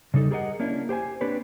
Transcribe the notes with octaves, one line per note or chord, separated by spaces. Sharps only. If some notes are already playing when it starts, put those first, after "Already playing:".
C#3 G3 D#4 A4
G4 G#4 A#4 B4 D#5 F#5
A#3 C#4 D4 E4
G4 C5 G5 G#5
A#3 C4 D4 G4 B4 C#5